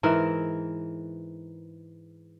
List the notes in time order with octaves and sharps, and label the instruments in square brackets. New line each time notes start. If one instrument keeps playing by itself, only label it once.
[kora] G#2 E3 A#4 E5